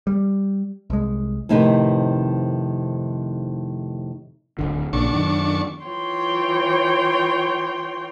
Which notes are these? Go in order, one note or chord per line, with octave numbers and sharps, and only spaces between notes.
G3
C2 G#3
F2 A2 C3 D#3 D#4 B4
D1 G#1 D3
A#1 A#2 C#3 D4 C#6
F#2 D#3
E3 F4 C#5 G5 C6